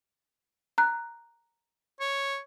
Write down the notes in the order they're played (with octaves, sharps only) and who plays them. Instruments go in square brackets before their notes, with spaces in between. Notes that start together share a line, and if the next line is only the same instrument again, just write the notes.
[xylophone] A#5 F#6
[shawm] C#5